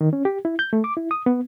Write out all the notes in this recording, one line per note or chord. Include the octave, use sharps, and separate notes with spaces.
D#3
C#4
G4
E4
G6
A3
D6
E4
D#6
B3